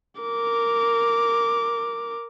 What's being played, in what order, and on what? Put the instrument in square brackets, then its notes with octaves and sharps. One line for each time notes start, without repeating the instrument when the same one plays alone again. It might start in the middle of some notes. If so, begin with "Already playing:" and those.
[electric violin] A#4 D6